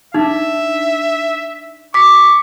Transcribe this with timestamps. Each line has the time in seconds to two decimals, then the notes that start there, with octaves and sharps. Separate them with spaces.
0.14 D4 D#4 E5
1.94 C#6 D6 B6